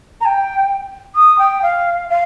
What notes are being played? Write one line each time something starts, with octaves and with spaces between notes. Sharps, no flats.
A#5
G5
D#6
G5
F5
F5